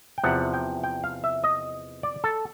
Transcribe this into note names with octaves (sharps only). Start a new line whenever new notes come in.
G5
E2 C3 F3 F#5
G5
G5
F5
E5
D#5
D5
A4